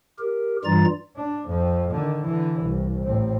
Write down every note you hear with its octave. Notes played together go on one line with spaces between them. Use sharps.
G4 A#4
G2 E3 G3 F4 A#5 A6
D4
F2
D3 D#3
D3 E3
C2
A1 C4